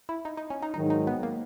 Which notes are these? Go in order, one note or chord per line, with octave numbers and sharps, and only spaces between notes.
E4
D#4
D#4
C#4
D#4
G#2 D#3 F#3 D#4
D#4
B3
A#3